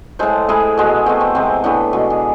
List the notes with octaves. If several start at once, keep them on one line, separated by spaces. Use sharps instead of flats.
A2 G#3 A4 C5
A2 G#3 E4 G#4
B2 G#3
B2 A3 C4
C4
C3 G#3 C4
A2 E3 A3 B3 D4
B2 G#3
G#4